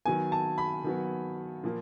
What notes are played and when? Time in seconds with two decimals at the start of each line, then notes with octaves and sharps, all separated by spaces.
0.05 D#3 F#3 B3 G#5
0.32 A5
0.58 B5
0.84 D#3 F#3 B3
1.63 A#2 F3 A#3